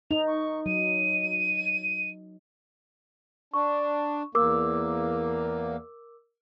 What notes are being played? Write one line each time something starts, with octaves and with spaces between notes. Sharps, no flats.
D#4 F7
C#6
F#3 D#7
D4 C#6
E2 A#3 A#4 D6 E6